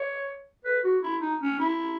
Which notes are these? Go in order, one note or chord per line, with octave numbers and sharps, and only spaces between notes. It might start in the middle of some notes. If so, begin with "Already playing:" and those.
Already playing: C#5
B4
F#4
E4
D#4
C#4
E4